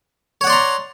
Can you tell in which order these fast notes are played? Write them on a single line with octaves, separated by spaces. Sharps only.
C#5 F#5 D5 C6 A#5